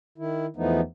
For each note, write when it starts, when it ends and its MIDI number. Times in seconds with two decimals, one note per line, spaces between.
0.18 0.46 51
0.18 0.46 64
0.57 0.81 40
0.57 0.81 52
0.57 0.81 53
0.57 0.81 57
0.57 0.81 59
0.57 0.81 63